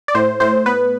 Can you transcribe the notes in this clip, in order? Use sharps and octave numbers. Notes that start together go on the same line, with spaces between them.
D5
A2 C5
A2 C5
B3 B4